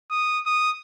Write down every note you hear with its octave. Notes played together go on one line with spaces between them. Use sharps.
D#6
D#6